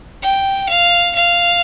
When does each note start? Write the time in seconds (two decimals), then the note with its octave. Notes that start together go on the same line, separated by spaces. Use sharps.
0.23 G5
0.69 F5
1.15 F5